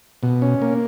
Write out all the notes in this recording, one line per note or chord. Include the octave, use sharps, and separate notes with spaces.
B2
C#4
A#3